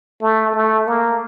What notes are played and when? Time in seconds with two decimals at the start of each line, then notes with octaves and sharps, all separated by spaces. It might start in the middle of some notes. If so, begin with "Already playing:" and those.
0.22 A3
0.55 A3
0.87 A#3